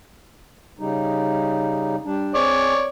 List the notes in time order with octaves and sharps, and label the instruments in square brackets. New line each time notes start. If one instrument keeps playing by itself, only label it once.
[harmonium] C#3 G3 D#4
G3 D4
[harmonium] C4 G#4 [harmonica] C#5 D5